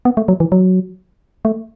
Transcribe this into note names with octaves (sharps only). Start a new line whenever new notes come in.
B3
A3
F#3
E3
F#3
A3